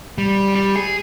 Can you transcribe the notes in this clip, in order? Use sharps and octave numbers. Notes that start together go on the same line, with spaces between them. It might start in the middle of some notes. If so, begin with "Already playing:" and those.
G3
G3
G#4